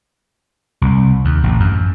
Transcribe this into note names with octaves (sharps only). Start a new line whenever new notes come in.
C2
D#2
A1
F#2